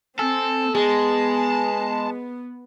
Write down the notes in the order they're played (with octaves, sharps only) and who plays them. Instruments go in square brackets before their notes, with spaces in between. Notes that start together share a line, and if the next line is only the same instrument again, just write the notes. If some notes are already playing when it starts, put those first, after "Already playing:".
[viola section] C4 [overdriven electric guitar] A4 [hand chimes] G#5
[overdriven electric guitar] G#3 [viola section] B3 [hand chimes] G#4 [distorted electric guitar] A5